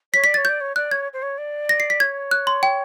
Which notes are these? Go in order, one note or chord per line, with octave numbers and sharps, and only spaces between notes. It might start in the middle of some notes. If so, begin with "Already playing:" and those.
C#5 B6
D5 B6
C#5 A6
D5 G6
C#5
D5 F#6
C#5 G#6
C5
C#5
D5
A#6
C7
B6
C#5 G#6
F#6
C6
G5